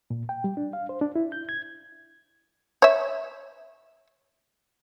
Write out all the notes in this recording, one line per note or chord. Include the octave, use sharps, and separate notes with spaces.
A#2
G5
G3
D4
F5
C5
D4
E4
G6
G#6
C#5 E5